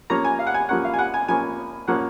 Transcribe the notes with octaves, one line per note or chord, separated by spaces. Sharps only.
F3 A#3 C#4 A#5
G#5
F5
F#5
G#5
F3 A#3 C#4 F#5
F5
G#5
F#5
G#5
F3 A#3 C#4 G#5
F3 A#3 C#4 F#5